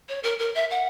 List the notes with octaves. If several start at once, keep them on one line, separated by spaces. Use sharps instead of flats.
C#5
A#4
A#4
E5
F#5